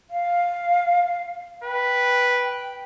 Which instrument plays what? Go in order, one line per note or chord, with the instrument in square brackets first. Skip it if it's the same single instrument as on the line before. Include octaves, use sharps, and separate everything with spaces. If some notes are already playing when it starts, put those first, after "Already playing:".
[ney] F5
[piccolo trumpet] B4 [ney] G5